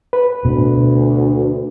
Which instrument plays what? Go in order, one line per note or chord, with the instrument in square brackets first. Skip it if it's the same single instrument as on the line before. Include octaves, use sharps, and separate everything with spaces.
[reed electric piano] B4
[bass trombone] D2 [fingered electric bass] B2